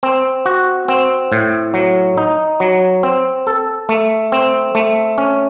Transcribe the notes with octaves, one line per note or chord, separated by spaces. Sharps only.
C4
F#4
C4
A2
F#3
D#4
F#3
C4
A4
A3
C4
A3
C#4